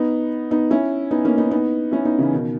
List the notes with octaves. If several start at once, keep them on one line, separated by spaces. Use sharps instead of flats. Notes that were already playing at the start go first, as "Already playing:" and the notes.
Already playing: B3 D#4
B3 D#4
C#4 E4
B3 D#4
A#3 C#4
B3 D#4
B3 D#4
C#4 E4
B3 D#4
C#3 E3
B2 D#3